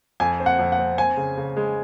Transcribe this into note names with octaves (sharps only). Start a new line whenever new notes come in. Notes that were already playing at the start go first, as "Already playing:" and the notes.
F2 G#5
C4
F#5
F2
F#5
C4
C4 G#5
C#3
C#3
G#3